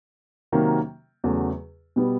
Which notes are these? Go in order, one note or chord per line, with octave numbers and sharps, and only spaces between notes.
C3 D#3 F#3 A#3
E2 C#3 F#3 A3
B2 G3 B3